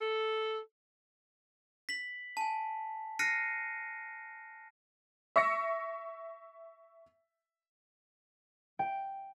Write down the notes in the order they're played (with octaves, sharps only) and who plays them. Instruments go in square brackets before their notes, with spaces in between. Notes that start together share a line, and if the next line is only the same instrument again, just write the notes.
[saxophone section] A4
[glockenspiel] B6 F#7
G#5 A5
F6 F#6 A#6 C7 C#7 D#7
[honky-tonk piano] E5 C#6 E6 A#6 C#7
[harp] G5